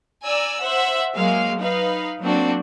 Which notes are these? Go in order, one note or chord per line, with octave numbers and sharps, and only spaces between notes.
D5 G#5 A#5 E6
C5 E5 F#5
F#3 G#3 A#3 F5
D#4 B4 F5
F#3 A#3 C4 D4 F#4